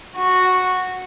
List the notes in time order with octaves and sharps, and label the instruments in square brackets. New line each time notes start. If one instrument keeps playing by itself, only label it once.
[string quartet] F#4